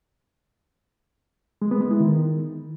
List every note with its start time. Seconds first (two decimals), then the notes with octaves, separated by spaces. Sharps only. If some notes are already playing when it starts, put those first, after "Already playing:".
1.62 G#3
1.71 B3
1.81 G#3
1.91 E4
2.00 D#3